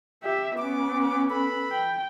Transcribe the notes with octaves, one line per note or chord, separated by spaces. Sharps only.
G4 E5
B3 C#4 D6
A4 B4 B5
G5